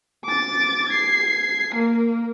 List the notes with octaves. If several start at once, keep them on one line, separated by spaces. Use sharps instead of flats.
D6 A6
G#6 C7
A#3 A#4